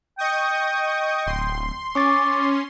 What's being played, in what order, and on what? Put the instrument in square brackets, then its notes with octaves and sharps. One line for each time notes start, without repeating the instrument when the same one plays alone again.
[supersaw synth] D#5 C#6 D#6 [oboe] G5
[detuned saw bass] D1 [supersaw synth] C6
[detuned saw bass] C#4 [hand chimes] C#6 D6 A6